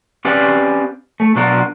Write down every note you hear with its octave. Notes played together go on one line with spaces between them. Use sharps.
C4 C#4 G4 B4 D5 F5
A3
B2 F#3 D4 F4 A#4